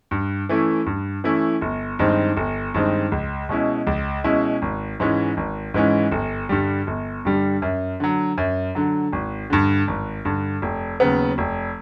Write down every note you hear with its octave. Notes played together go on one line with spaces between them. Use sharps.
G2
E3 A3 C#4 E4
G2
E3 A3 C#4 E4
G1
G2 D#3 G#3 C4
G1
G2 D#3 G#3 C4
C#2
B2 G#3 C#4 E4
C#2
B2 G#3 C#4 E4
G#1
G#2 E3 G#3 C#4
G#1
G#2 E3 G#3 C#4
G1
G2 D3 G3
G1
G2 D3 G3
F#2
D3 F#3
F#2
D3 F#3
G#1
G2 D3
G#1
G2 D3
F1
D#2 C#3 F#3 B3
F1